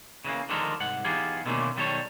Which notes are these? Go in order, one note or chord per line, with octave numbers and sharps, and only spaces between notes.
C#3 E3 G#3 A#3
D3 D#3 F3 G#3 A4 A#4
C2 G#2 F#5
E3 B3 D#4 F4 G4 G#4
B2 D3 D#3 A3 A#3 C#4
B1 D#3 G3 F#4 A4 C#5